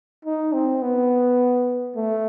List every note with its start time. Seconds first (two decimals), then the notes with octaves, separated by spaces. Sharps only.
0.25 D#4
0.53 C4
0.82 B3
1.96 A3